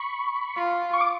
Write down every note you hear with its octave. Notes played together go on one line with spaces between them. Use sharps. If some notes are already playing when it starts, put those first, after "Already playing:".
Already playing: B5 C#6
F4
C#6
D6